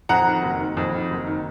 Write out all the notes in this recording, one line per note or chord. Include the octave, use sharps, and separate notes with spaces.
F2 F#5 A#5
D#3
F#1
D#3
F2
D#3
F#1
D#3